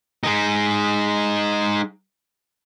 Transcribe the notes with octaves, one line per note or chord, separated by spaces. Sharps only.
G#3 D#4